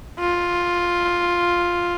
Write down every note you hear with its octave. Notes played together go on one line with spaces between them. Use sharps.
F4